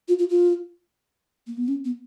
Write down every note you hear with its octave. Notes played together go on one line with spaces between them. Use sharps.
F4
F4
F4
A#3
B3
C#4
B3